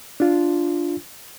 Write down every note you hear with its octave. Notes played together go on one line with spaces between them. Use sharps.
D4 F4